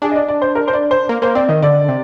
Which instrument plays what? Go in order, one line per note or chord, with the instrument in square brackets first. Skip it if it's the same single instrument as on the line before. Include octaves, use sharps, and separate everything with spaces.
[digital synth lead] D4 [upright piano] G#4
[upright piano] D#5
D5
D5
C5
A#4
C5
D5
C5
[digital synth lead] A#3
[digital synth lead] A#3 [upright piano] C5
[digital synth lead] C4 [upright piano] D5
[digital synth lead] D#3 [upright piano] D#5
[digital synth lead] D3 [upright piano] D5
[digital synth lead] C3